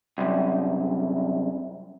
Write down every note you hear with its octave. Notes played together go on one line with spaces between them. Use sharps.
C2 F#2